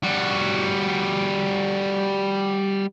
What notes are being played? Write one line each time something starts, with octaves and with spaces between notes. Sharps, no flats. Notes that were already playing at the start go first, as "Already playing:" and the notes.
G3 F#4